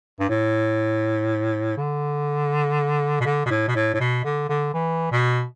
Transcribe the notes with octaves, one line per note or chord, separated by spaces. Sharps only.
G2
A2
D3
B2
D3
B2
A2
B2
A2
A2
B2
D3
D3
E3
B2